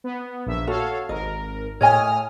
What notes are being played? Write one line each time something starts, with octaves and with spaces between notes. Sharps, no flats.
B3
A#1 E5
F#4 A4 C#5 F5
G#1 A#4 D#5
A2 C#5 D#5 G#5 D#6 F6